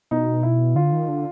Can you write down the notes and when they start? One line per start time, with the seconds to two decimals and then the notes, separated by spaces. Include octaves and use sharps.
0.11 B2 D#4
0.43 E4
0.75 D3 F4
0.92 D#3
1.08 D3